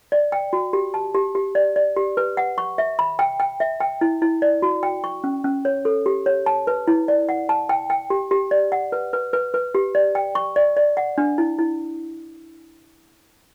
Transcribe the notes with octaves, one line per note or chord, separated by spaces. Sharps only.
D5
G5
F#4
G4
A5
G4
G4
D5
D5
G4
B4
F#5
C#6
E5
B5
G5
G5
E5
G5
E4
E4
D5
F#4
G5
C#6
C#4
C#4
C#5
A4
G4
C#5
A5
B4
E4
D5
F#5
A5
G5
G5
G4
G4
D5
F#5
B4
B4
B4
B4
G4
D5
G5
C#6
D5
D5
F#5
D4
E4
E4